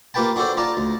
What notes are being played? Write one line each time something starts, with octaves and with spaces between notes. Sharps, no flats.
A#3 F4 G4 B4 G5 A5
D4 F#4 A4 C5 D5
F4 D5 A5 A#5
D2